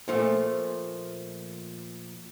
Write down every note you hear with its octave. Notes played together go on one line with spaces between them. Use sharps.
A#2 F3 A3